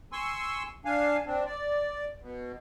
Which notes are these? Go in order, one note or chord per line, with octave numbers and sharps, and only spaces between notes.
G#5 C6 C#6 E6
D4 F5 G#5
C4 D4
D5
B2